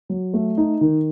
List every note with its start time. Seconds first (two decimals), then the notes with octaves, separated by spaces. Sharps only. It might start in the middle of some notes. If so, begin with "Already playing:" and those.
0.09 F#3
0.34 A3
0.57 D#4
0.81 D#3